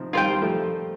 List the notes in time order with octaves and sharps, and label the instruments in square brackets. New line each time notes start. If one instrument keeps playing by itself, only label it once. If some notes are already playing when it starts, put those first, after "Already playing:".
Already playing: [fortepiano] C3 D#3 F3
[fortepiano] D#3 G3 [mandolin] F4 C5 G5
[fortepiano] G3
F3 A3